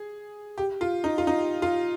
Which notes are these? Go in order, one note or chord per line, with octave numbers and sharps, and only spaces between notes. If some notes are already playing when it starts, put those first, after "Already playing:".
Already playing: G#4
G4
F4
D#4
F4
D#4
F4